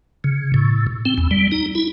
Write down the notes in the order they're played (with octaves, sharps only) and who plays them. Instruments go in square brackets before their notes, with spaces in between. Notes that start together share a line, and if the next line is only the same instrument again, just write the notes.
[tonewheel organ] C#3
A2
C4
E2
G3
D#4
E4